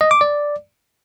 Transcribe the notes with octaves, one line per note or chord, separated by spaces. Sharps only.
D#5
D6
D5